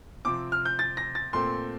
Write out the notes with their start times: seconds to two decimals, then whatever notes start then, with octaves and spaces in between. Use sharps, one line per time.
0.25 C3 F3 C4 D6
0.52 F6
0.65 G6
0.79 A6
0.97 A#6
1.15 A6
1.33 A#2 A3 C4 C6